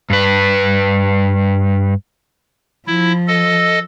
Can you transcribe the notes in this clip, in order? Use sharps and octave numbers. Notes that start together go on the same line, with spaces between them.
G2 B4
F3 E4
A4 D#5